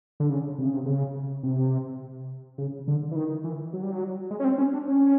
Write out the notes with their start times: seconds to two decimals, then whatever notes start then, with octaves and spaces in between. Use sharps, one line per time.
0.20 D3
0.30 C#3
0.58 C3
0.66 C#3
0.74 C3
0.86 C#3
1.43 C3
2.58 C#3
2.88 D3
3.11 E3
3.16 D#3
3.44 E3
3.73 F#3
3.83 G3
3.92 F#3
4.30 G#3
4.40 C#4
4.44 C4
4.58 C#4
4.73 D4
4.88 C#4